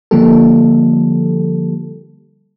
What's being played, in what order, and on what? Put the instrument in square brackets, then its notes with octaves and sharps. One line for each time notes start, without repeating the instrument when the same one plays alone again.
[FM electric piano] D3 F3 G3 A#3 G4 A4